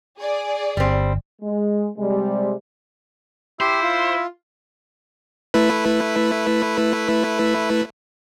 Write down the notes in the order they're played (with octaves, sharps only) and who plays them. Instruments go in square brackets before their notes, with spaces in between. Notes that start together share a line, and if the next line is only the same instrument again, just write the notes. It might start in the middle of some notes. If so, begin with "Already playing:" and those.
[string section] G#4 D5
[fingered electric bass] G1 [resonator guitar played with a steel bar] G3 C4
[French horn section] G#3
C3 G3 G#3
[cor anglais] E4 [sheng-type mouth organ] G4 C6 [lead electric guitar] C5
[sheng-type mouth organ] F4
[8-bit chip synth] A3 E4 B4